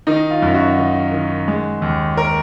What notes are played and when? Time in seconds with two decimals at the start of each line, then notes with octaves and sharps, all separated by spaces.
0.07 D#3 D#4
0.31 F4
0.42 F#2
0.54 F#4
0.78 D#3
1.12 D#3
1.48 G#3
1.82 D#2
2.17 A#4